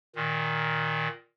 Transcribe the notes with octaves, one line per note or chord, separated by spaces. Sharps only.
A#2 D#3